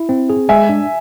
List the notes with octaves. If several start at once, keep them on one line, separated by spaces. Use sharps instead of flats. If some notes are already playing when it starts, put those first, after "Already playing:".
Already playing: E4
C4
G#4
G#3 E5 G#5
D4